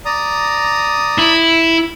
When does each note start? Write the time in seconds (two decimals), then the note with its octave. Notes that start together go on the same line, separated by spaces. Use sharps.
0.05 D5 A#5 D#6
1.18 E4